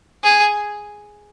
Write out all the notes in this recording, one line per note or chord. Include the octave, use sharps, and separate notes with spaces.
G#4